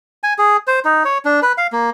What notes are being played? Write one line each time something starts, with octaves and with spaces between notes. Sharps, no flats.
G#5
G#4
C5
D#4
C#5
D4
B4
F5
A#3